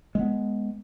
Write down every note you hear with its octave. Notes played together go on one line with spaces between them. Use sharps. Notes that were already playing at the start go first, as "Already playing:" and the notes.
G#3 B3